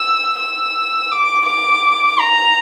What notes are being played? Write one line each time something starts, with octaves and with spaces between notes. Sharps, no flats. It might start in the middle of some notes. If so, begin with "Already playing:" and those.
Already playing: E6
E6
D6
D6
A#5